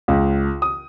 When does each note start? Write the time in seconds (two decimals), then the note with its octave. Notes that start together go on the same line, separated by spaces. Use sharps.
0.08 C#2
0.62 D#6